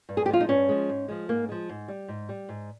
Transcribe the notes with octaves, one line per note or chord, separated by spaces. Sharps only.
G2
G#4
G4
F3 G#3 F4
D#4
G2 C#4
F3 G#3
G#2
F3 G#3
G#2 A#3
F3 G#3
G#2
G3
G#2
G3
G#2